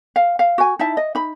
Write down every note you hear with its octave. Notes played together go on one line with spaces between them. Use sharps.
F5
F5
F#4 G#5
D#4 E4 E5 A5
D#5
D#4 B5